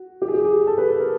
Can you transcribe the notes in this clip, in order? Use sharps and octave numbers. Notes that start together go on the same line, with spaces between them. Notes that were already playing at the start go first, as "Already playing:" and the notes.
Already playing: F#4
G4
G#4
G4
G#4
G#4
A4
B4
B4
A#4